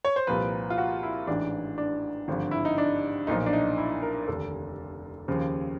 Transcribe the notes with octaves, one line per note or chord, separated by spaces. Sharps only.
C#5
C5
C2 A#2 F3 B4
F4
F#4
E4
A1 G#2 E3 D4
D4
G#1 G2 D3 F3
E4
D#4
D4
B1 A#2 F3 D#4
D4
D#4
E4
A#4
F1 D#2 D3 A4
D#2 C#3 F3